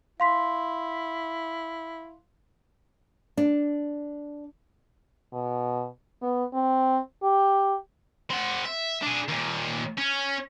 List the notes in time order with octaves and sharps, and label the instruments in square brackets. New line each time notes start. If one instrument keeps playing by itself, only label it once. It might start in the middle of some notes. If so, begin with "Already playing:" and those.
[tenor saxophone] E4 [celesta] F5 C6 B6
[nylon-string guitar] D4
[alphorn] B2
B3
C4
G4
[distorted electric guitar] C4 F#5
E5
D4 G#4
D#2 A#2
C#4